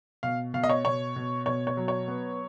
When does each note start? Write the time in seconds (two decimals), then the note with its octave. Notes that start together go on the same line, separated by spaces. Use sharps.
0.23 B2 F5
0.54 B2 F5
0.64 D#5
0.70 C#5
0.85 B2 C#5
1.16 B2
1.46 B2 C#5
1.67 C#5
1.77 F#3
1.88 C#5
2.08 B3